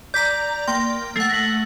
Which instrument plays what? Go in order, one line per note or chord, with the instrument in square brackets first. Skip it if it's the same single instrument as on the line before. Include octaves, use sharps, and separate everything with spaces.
[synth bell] D5 A#5 [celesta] G6 B6
[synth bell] A#3 G5 [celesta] C6
[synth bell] A3 F#5 [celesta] C7
[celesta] A#6 B6 F#7